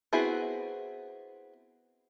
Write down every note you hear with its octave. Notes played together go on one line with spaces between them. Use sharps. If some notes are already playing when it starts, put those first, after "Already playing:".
B3 C4 E4 F#4 G#4